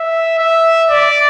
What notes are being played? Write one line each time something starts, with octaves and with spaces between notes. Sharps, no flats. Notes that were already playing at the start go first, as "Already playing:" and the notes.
Already playing: E5
E5
D5